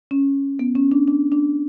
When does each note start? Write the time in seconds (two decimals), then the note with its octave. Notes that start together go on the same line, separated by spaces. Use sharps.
0.11 C#4
0.59 B3
0.75 C#4
0.92 D4
1.08 D4
1.32 D4